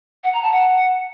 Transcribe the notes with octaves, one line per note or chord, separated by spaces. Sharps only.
F#5
A#5
A5
F#5